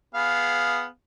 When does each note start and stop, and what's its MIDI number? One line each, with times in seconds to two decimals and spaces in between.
0.15 0.86 59
0.15 0.86 68
0.15 0.86 77